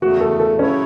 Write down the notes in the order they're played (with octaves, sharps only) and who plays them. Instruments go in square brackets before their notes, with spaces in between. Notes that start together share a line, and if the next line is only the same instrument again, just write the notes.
[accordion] E2 C#3 A3 [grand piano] F#4
[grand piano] A4
A4
[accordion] C#3 F#3 A3 E4 C#5 [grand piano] C#4